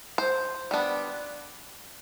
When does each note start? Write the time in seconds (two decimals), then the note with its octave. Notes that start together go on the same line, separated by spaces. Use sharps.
0.18 C5
0.71 G3 B3 D4